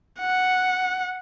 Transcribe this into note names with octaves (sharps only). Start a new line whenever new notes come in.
F#5